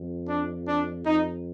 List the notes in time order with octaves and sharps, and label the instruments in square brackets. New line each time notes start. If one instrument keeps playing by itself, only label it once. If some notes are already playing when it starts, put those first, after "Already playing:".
Already playing: [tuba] F2
[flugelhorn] D4
D4
[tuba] F2 [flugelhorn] D#4